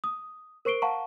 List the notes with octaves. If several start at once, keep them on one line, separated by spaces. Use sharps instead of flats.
D#6
A#4 C5 C#6 C7 D7 G7
F5 F#5 A5 A#5 C#6